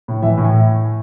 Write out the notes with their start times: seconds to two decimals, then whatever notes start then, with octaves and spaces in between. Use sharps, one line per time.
0.08 A2
0.22 E3 E5
0.37 A2
0.45 G#5